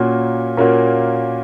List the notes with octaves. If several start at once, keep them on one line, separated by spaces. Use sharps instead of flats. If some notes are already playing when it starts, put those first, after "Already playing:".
Already playing: A#2 A#3 C#4 F#4 A#4
A#2 A#3 C#4 F#4 A#4